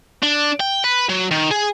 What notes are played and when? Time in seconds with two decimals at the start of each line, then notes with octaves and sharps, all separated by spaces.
0.23 D4
0.60 G5
0.84 B4
1.09 F#3
1.31 D#3
1.51 G#4